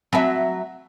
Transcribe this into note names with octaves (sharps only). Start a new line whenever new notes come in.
F#3 C4 E5 A5 B5